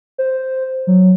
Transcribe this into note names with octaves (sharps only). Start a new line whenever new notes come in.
C5
F#3